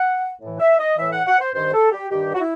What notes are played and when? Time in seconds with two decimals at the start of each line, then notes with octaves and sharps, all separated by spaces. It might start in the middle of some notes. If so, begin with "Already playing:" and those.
Already playing: F#5
0.42 A2 E3
0.60 E5
0.78 D#5
0.98 A2 E3 E5
1.12 F#5
1.27 F#5
1.40 C5
1.54 G2 D#3 C5
1.74 A4
1.92 G4
2.11 G2 D#3 G4
2.35 F#4
2.40 E4